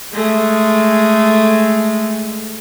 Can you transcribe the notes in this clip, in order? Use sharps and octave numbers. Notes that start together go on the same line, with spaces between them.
G#3 A3